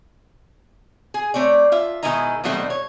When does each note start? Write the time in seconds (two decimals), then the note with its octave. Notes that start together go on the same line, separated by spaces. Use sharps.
1.14 G#4
1.34 A3 C4 C#5 D5
1.72 F4 E5
2.03 B2 D#3 G#3 E4 D#5 A#5
2.44 B2 D#3 F#3 G3 A3 C4
2.70 C#5